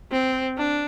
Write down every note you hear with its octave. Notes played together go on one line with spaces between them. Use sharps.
C4
D4